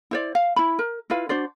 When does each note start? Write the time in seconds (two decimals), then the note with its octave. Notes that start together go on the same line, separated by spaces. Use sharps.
0.11 E4 C5 D5
0.35 F5
0.56 E4 B5
0.79 A#4
1.10 E4 F4 B4 F5
1.29 D4 F#4 C5 D5